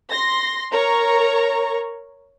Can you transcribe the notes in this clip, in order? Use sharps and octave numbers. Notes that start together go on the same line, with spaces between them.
C6 A#6
A#4 C#5 A#5 C#6